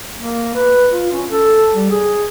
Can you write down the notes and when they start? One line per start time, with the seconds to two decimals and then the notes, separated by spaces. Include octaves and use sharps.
0.16 A#3
0.55 B4
0.90 F4
1.13 C#4
1.31 A4
1.75 G3
1.90 G#4